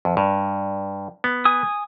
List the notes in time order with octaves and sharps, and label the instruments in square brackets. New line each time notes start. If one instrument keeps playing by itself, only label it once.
[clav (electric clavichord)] F2
G2
B3
[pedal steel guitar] G#5 D#6